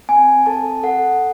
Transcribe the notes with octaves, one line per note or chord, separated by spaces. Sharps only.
C4 G#5
A4 A5
A4 F#5